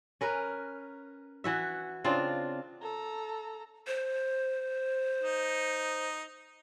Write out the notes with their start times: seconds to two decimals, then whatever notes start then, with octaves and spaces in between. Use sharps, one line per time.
0.21 C#4 A#4 B4
1.44 E3 F#4 E5
2.04 C#3 C4 D4 F4
2.82 A4 A#5
3.87 C5
5.23 D#4